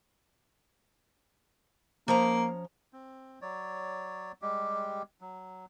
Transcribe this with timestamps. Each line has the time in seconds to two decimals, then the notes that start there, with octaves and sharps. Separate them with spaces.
2.08 F3 A#3 C#4 A#5
2.93 C4
3.42 F#3 C#5 D5
4.42 G3 G#3 G4
5.21 F#3